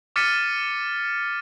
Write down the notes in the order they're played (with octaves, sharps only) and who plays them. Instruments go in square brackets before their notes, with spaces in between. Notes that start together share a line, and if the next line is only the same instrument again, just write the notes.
[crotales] D6 F6 A6 B6 C#7 D#7